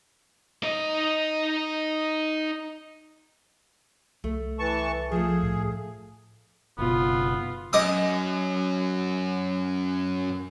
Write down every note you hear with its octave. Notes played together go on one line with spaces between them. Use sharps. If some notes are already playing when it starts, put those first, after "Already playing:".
D#4 D#5
C2 A3
E3 A5 C#6
F3 A3 G#4
A2
F#1 B2 B3 F4
F#2 D#5 D6 D#6